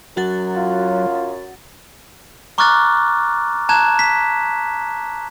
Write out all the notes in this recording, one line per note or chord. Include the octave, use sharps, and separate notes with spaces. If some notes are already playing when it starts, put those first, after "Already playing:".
F#2 F#3 F#4 F#5 A6
F4
A#5 C#6 D6 F6 F#6 A6
A5 A#5 F#6 G#6 E7
B6